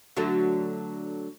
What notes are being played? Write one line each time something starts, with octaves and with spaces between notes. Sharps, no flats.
D3 F#3 A3